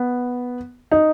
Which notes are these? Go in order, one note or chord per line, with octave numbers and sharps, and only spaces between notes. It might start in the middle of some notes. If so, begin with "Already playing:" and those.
Already playing: B3
D#4